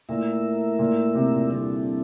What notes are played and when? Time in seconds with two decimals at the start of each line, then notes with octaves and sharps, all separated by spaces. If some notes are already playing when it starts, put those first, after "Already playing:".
0.09 A#2 A3 E4 A#4 E5
0.79 A#2
1.15 C3
1.32 A#2
1.50 D3 G3 C4 E4 A4